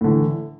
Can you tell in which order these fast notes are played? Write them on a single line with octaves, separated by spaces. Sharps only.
A2 D3 E3